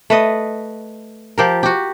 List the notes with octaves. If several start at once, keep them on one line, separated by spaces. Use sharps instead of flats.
A3 B4 D#5
F3 G4 A#4
F#4 G4